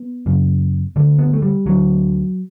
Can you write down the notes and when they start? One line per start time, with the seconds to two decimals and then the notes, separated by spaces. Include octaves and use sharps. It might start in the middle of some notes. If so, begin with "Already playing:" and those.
Already playing: B3
0.26 F#2 C#3
0.96 D3 G3
0.99 D2
1.19 B3
1.33 A3
1.42 G3
1.66 D2 D3 F#3